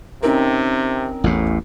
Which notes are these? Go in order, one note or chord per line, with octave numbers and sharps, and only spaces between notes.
C3 C4 C#4 D#4 A#4
A1 E2 A2